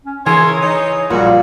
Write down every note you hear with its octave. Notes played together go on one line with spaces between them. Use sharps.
C#4
E3 E4 G#4 A#4 C#5 C6
D#4 C#5
A#1 G2 A#2 G3 G#3 F#4